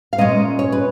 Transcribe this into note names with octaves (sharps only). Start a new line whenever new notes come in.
F5
A#2 G#3 C#4 D#5
C#5
B4